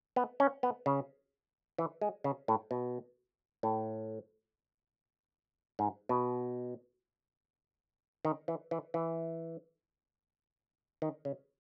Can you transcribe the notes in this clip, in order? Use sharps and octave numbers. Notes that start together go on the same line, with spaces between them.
B3
C#4
B3
C#3
E3
G#3
C#3
A2
B2
A2
G#2
B2
D#3
E3
E3
E3
D#3
C#3